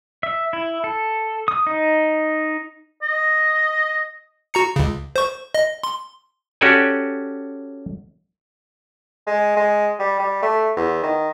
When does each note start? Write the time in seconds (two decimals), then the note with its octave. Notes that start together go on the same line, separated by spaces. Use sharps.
0.23 E5
0.53 E4
0.84 A4
1.48 D#6
1.67 D#4
3.02 D#5
4.54 F#4 A#5 C#7
4.76 C#2 C#3
5.16 C5 C#6
5.54 D#5
5.83 C6
6.61 C#4 F#4 G4 A4 D5 G#5
9.27 G#3
9.56 G#3
9.99 G3
10.19 G3
10.42 A3
10.76 E2
11.03 D#3